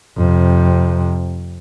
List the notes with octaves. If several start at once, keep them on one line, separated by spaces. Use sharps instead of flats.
F2 C3